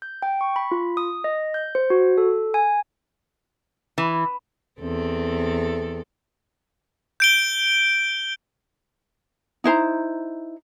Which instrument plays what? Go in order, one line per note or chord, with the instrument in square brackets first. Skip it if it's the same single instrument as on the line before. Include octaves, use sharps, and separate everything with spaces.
[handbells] G6
G5
C#6
B5
F4
D#6
D#5
G6
C5
F#4
A4
G#5
[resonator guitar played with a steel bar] E3
[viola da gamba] E2 C4 A4
[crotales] G6 D7 G7
[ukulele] D#4 E4 C5 A#5